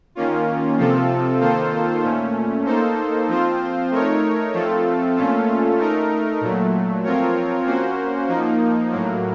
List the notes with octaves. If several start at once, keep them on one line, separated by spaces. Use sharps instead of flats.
D#3 A#3 C#4 F4
C3 F3 C4 F4 A4
D#3 A#3 F4 A4 C5
A#2 A3 C#4
A#3 D#4 A4 C5
F3 C4 F4 C5
A3 D#4 A#4 C#5
F3 A3 C4 F4 A4
A#2 A3 C#4 F4 A4
A3 D#4 A#4
A#2 F#3 A3
F3 C4 F4 A#4 C#5
A#3 C#4 F#4 C5
F3 A#3 D#4
A2 F#3 A#3